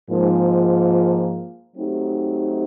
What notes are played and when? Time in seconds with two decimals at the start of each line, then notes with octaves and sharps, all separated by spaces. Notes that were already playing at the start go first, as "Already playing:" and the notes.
0.10 G#2 F3 A#3
1.76 F#3 A3 C4 D#4 G4